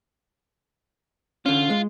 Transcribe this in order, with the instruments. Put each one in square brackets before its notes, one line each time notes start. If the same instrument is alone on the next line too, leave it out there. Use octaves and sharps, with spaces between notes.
[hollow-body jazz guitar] D3 C#4 [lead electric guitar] F4
[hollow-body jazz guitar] G#3